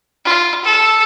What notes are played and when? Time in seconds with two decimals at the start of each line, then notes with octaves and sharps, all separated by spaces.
0.25 F4
0.64 A4